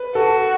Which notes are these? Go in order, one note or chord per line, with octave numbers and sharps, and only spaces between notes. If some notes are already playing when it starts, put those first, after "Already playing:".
Already playing: B4
F#4 A4